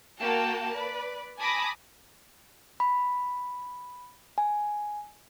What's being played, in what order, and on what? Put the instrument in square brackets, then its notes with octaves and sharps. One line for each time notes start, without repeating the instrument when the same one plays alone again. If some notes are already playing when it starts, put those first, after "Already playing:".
[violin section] A#3 F#4 G5 A5
B4 D5
G#5 A5 B5 D6 D#6 A#6
[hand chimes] B5
G#5